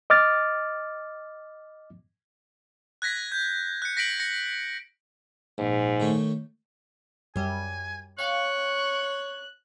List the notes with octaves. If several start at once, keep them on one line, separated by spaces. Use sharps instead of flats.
D#5 D6 F6 A6
F#6 G#6 A#6 B6
G6
F#6 C#7
A#6 B6 C#7 D7 F#7
A#6 C#7
A#1 G#2
D#3 A3 C#5
F#2 G3 G#5
C#5 F5 G5 C#6 F#6